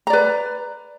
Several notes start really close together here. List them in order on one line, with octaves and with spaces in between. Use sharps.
A#5 D5 B4